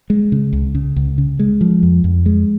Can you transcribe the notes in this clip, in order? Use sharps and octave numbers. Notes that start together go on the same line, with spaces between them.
G#3
C#3
C#2
C#3
C#2
C#3
G#3
F3
F2
F2
G#3